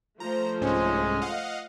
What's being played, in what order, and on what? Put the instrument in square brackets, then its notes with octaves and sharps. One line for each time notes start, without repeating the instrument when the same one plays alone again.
[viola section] F3 A3 C5 [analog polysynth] A#5
[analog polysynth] C2 G#2 C#4 [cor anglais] G#3
[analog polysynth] D#5 F5 F#5